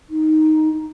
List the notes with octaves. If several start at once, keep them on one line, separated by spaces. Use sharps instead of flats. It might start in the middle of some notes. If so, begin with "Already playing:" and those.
D#4